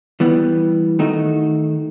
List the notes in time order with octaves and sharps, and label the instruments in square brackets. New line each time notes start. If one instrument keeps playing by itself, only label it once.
[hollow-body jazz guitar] E3 G3 B3
D#3 A3 D#4 F#4